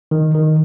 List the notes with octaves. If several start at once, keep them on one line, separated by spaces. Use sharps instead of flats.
D#3
D#3